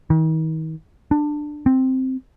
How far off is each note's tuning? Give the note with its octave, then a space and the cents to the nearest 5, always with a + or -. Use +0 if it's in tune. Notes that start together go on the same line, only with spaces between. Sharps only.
D#3 +40
D4 +15
C4 +0